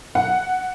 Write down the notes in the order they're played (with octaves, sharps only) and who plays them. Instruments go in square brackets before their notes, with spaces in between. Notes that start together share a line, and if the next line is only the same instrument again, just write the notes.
[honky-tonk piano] F#5